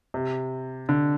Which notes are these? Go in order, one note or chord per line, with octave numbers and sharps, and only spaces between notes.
C3
D3